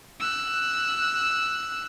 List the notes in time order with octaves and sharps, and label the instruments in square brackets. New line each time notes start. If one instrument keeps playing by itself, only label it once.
[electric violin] E6 F#6